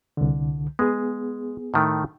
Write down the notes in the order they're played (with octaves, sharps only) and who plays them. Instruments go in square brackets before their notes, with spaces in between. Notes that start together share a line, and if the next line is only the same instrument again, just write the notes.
[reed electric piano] C2 D3
[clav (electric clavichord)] G#3 [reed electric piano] B3 G#4
[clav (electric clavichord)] A2 D#3 A3